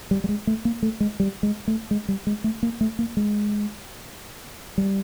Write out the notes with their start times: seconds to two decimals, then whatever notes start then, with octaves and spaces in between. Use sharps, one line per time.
0.11 G3
0.24 G3
0.29 G#3
0.47 A3
0.65 A#3
0.83 A3
1.00 G#3
1.20 G3
1.43 G#3
1.68 A3
1.91 G#3
2.08 G3
2.27 G#3
2.44 A3
2.63 A#3
2.81 A3
2.99 A#3
3.17 G#3
4.78 G3